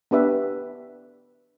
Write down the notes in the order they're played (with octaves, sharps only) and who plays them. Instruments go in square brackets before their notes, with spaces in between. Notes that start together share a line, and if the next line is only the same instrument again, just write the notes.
[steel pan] B3 D4 G4 B4 E5